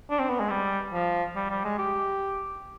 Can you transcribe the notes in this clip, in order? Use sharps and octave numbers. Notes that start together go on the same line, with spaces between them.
D4
C4
B3
G#3
G3
F3
G3
G3
G#3
G4